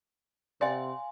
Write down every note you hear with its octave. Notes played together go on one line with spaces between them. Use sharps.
C3 D5 F5 F#5 G#5 C6